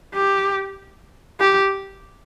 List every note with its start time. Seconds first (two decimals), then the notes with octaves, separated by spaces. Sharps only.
0.15 G4
1.40 G4